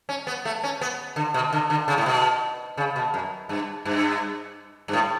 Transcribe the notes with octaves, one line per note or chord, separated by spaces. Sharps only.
C#4
B3
A3
C#4
B3
D3
B2
D3
D3
C#3
A2
B2
C#3
B2
F#2
G2
G2
G2
A2